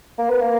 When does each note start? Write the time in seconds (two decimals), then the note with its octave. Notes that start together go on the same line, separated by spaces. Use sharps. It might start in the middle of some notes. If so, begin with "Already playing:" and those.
0.18 A#3
0.30 B3
0.42 A#3